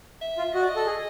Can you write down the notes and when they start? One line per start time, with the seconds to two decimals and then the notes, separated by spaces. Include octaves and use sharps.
0.21 E5
0.38 F4
0.53 F#4 D#5
0.62 D5
0.69 D#5
0.76 A4
0.86 G#4